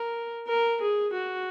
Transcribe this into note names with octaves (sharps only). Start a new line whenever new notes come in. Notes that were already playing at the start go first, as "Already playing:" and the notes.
Already playing: A#4
A#4
G#4
F#4